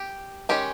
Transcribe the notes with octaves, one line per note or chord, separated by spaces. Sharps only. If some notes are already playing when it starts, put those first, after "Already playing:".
Already playing: G4
D#3 G#3 C#4 G4